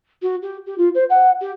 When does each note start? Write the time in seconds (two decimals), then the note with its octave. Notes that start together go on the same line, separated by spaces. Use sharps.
0.22 F#4
0.42 G4
0.66 G4
0.78 F4
0.95 C5
1.10 F#5
1.41 G4